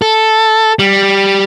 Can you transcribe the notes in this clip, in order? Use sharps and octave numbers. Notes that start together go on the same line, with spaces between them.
A4
G3